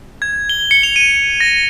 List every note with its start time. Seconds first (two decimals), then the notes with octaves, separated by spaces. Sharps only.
0.22 G#6
0.49 G7
0.71 C#7
0.83 F7
0.96 D#7
1.40 A#6